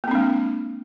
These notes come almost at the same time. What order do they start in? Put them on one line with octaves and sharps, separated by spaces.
A#3 C4 D4 G#3